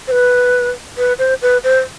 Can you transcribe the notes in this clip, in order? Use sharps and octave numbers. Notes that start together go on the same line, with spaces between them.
C5
B4
B4
C5
B4
C5